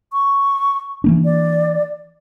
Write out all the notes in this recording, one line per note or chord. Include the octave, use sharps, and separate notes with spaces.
C#6
E3 A#3 D4
D5